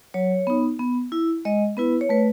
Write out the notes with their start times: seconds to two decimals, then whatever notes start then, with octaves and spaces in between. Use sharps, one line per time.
0.14 F#3 C#5
0.47 B3 D#4
0.79 B3
1.12 E4
1.45 G#3 D#5
1.77 B3 E4 B4
2.01 C#5
2.09 A3 B4